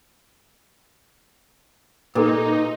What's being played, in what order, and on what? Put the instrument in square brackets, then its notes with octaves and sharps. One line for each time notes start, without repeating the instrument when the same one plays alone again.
[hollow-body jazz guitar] A#2 [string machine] D#4 [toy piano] G4 A4 B4